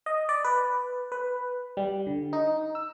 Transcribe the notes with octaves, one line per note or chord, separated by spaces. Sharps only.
D#5
D5
B4
B4
G3
D3
D#4
E6